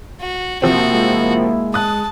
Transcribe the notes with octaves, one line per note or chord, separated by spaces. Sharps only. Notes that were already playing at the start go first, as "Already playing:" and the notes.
F#4
C3 F3 A#3 C4 E4 F#4
G#3
A5 D#6 F#6